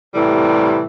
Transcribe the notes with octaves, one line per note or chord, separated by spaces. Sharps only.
A2 C3 E3 G3